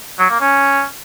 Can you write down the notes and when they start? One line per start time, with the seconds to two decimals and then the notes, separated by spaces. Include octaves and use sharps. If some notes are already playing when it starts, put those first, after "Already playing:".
0.19 F#3
0.30 A#3
0.40 C#4